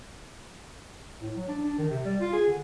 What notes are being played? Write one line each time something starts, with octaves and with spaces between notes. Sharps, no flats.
A2
F#3
D4
D4
D#3
C3
G3
F4
G#4
D3